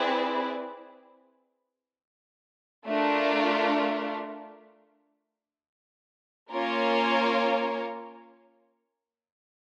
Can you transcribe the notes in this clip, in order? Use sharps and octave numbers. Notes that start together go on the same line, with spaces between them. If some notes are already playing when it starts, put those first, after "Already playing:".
Already playing: C4 E4 G#4 B4 D5
A3 D4 F4 A#4
A#3 C#4 F4 A#4 C#5